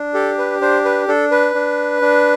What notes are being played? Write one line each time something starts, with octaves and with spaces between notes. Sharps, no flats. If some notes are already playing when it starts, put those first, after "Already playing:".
Already playing: D4
G4 A4
B4
D4 C5
B4
D4 A4
B4
D4
D4